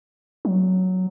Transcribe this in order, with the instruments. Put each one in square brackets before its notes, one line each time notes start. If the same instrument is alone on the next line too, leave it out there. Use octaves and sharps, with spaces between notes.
[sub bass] F#3